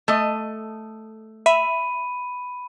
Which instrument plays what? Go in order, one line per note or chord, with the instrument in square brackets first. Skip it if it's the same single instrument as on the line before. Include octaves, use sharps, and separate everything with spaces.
[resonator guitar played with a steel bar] A3 D#5
[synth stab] E5 [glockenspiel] B5 D#7